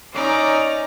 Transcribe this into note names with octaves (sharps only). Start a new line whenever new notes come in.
C#4 D#4 D5 A#5